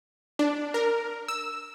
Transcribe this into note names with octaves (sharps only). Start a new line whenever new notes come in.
D4
A#4
E6